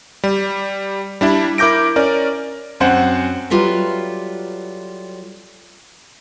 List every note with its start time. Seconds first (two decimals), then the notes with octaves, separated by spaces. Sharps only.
0.24 G3
1.21 G3 D4 E4
1.58 E4 A#4 D6 G6 A#6 D7
1.96 C#4 A#4 D5
2.80 F#2 C4 C5 F#5
3.50 F#3 G3 F4 A4 B4 E5